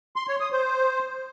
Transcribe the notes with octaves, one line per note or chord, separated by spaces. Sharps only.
C6
C#5
D#6
C5